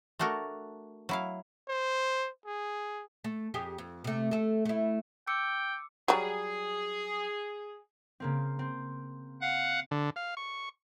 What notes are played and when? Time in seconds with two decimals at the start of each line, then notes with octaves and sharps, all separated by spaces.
0.19 A3 D4 F#4 A4 A#4
1.09 F#3 E4 F5
1.68 C5
2.46 G#4
3.24 A3
3.54 F2 G4 G#4
3.78 F2
4.04 C3 A3
4.31 A3 A4
4.65 A3 E4
5.27 G5 D6 E6 C#7
6.08 F#3 G3 G#4
8.20 C#3 A#3 C4
8.59 C4
9.41 F5 F#5 F#6
9.91 D3
10.16 F5
10.37 C#6